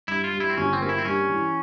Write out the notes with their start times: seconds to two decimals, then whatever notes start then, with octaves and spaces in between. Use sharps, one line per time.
0.08 G2 E4
0.24 F4
0.32 G3
0.40 E4
0.50 C4
0.57 G1 C#4
0.73 C4
0.81 A#3 C#4
0.89 E4
0.98 C4
1.05 G2 C#4
1.29 E3